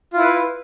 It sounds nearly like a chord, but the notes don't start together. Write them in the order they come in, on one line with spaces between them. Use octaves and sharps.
F4 E4 B4